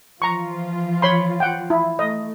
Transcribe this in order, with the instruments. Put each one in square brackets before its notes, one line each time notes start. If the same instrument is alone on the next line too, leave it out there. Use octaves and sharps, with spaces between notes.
[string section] E3 F3 F4 [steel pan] A#5 C#6
[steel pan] C#5 B5 C6
F#5 G5
E4
[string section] A3 [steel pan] D#5